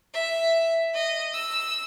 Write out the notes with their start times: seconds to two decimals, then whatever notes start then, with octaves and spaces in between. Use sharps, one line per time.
0.14 E5
0.94 D#5
1.34 E6